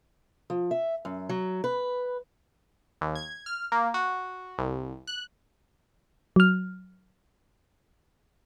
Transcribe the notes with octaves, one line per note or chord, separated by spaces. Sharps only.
F3
E5
F#2
F#3
B4
D#2
G#6
F6
A#3
F#4
C2
F#6
F#3 F6